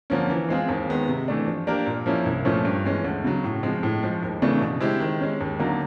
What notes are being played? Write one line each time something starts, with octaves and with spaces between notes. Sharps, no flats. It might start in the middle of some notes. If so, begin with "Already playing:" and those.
D3 F3 A#3 C#4
E3
G#3 C4 F4 G#4
D#2
D#3 G#3 B3
C3
E3 A3 D4
F3
A#3 D4 G4 A#4
A#2
F3 A#3 C#4 E4
C2
A#2 F3 A3 C#4
G2
E3 G#3 C#4
D2
C#3 F#3
A2
F3 G#3 C4
A2
F3 G#3
D#2
C#3 E3 A3 D4
B2
G#3 C4 E4 G4
D#3
G#3 C#4
D#2
D3 F#3 A#3 D#4